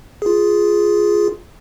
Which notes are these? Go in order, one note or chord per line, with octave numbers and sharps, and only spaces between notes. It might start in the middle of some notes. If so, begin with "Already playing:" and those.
F4 G#4